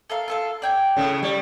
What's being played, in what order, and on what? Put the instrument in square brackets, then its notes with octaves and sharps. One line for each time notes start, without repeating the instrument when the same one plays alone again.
[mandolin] A4 A#4 F5
F4 A4 F5
D5 G5 G#5
[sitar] A2 C#3
[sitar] G3 [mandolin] C#5